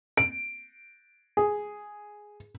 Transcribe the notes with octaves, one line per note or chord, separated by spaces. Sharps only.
D7
G#4